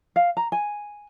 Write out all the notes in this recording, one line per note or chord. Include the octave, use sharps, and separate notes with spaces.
F5
A#5
G#5